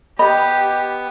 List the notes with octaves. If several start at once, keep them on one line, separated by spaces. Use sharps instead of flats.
B3 G4 D#5 B5